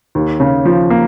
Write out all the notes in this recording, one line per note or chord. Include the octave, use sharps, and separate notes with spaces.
D#2
C#3
F3
A#3